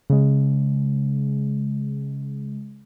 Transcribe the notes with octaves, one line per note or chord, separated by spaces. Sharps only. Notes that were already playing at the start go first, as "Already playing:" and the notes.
C#3 G#3